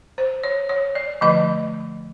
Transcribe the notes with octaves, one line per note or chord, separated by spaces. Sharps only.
C5
C#5
C#5
D5
D3 F3 A3 D#5